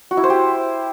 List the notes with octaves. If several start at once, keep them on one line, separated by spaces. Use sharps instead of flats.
F#4
E4
C5
G4